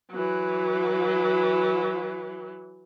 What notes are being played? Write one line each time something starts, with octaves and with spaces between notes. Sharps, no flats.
E3 F#3